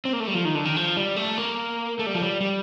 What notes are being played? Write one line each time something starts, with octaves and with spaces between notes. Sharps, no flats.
C4
A#3
A3
G3
F3
D#3
D3
D#3
F3
G3
A3
A#3
A3
G3
F3
G3
G3